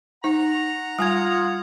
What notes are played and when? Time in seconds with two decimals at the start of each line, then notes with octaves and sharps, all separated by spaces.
0.24 D#4 F#5 A#5
0.99 G3 F4 G#5 D#6 G#6